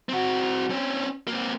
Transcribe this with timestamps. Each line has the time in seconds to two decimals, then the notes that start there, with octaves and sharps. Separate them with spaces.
0.09 C4 F#4
0.70 C4 C#4
1.28 A#3 C4